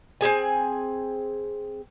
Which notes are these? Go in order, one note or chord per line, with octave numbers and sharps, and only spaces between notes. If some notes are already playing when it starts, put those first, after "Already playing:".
C4 E4 G#4 G#5